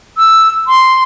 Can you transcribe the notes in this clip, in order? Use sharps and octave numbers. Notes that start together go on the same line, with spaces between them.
E6
C6